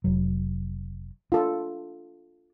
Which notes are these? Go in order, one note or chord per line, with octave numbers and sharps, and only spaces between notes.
F1 F#3
D4 F4 A4